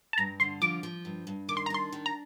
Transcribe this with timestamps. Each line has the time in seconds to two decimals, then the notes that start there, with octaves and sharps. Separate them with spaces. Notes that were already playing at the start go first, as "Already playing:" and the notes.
0.13 A5
0.18 G2 A#5
0.40 D3 C6
0.62 F3 D6
0.83 F3
1.05 G2
1.27 G2
1.49 D#3 D6
1.57 C6
1.66 A#5
1.70 D4 C6
1.92 D#3
2.06 A#5